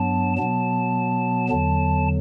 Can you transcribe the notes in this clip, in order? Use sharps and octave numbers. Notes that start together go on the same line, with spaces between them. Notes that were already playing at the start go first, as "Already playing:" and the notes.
Already playing: G2 F#3 B3 A5
B2 F#3 B3 A5
E2 D3 F#3 A5